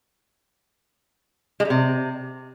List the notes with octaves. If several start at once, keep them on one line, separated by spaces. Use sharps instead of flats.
G#3
G3
C3